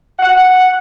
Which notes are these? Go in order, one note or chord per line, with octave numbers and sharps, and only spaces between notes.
F#5